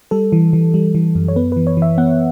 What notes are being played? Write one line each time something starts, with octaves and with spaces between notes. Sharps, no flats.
G3 A4
E3
E3
G3
E3
F#2
C#5
B3 B4
E3 B4
C#5
E3 E5
B3 F#5